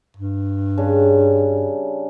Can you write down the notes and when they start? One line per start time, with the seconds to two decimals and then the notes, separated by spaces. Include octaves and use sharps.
0.17 G2
0.78 C#3 G3 D4